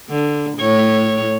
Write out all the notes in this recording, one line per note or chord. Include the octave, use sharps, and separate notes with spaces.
D3
A2 C#5